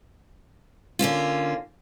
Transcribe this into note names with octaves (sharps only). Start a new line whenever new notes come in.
D3 A#3 C#4 F4